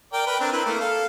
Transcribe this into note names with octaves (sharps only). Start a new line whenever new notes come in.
A#4 D5 G5
A#4 B4 G5
C4 D4 A#4
C4 E4 B4
A3 A#3 A#4
A4 F5